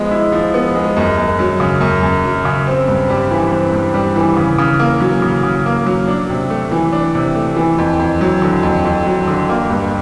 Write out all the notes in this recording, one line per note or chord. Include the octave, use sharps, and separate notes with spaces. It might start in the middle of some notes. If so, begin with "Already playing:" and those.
Already playing: F3 G#3 B3
E4
F3
B3
G#3
F#2
F#2
F#3
C#3
F#2
F#2
F#3
C#3
C4
G2
G3
E3
C4
G2
G3
E3
C#3
C#3
A#3
F#3
C#3
C#3
A#3
F#3
D4
C3
A3
E3
D4
C3
A3
E3
F2
F2
F#3
D3
F2
F2
F#3
D3
A#3
G2